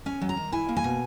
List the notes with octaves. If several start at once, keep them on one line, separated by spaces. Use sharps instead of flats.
C#4 G#5
F#3
A#5
D#3
E4 G#5
A#3
G#5
B2